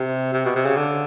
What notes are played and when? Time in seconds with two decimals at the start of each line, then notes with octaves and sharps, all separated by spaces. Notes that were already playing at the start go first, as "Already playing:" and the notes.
Already playing: C3
0.34 C3
0.45 B2
0.56 C3
0.66 C#3
0.76 D3